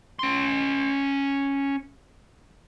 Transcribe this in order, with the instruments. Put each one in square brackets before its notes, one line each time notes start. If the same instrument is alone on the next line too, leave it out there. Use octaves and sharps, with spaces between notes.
[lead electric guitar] C#4 C6